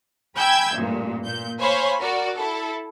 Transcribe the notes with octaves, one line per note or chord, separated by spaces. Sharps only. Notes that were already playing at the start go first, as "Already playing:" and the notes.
G5 G#5 B5 E6 G6 G#6
A1 G2 A#2
A#2 G6
C5 C#5 F5 G#5 B5
F#4 A#4 D5
E4 A4